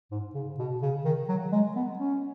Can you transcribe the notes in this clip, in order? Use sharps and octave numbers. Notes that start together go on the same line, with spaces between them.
G#2
C#3
B2
C#3
D#3
F#3
G#3
B3
C#4